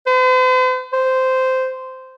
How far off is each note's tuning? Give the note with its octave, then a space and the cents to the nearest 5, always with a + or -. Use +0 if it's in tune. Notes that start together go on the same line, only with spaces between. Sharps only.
C5 -45
C5 -10